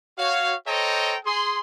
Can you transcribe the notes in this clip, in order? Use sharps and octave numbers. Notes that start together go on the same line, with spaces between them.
F#4 C#5 F5
A4 C5 C#5 D#5 G5 A#5
G#4 C6